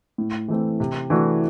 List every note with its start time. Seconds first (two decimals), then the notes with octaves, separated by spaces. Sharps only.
0.18 A2
0.48 E3 A3 C4
0.80 C3
1.10 E3 A3 D4 F#4